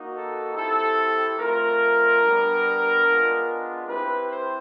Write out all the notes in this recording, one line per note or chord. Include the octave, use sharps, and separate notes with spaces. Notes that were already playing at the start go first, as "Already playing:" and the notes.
Already playing: A#3 D#4 F#4
A4
C4 E4 G4 A4
A3 C4 F4 A#4
G3 B3 D4
G#3 B3 D4 F4
C4 E4 G4 B4
C5